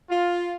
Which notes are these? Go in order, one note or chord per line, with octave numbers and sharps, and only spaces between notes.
F4